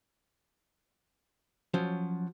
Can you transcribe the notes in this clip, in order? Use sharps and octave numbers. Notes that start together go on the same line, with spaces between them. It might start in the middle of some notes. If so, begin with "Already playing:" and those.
F3 F#3 C#4